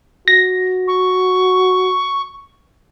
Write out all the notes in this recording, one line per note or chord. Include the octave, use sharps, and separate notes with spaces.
F#4 A#6
C#6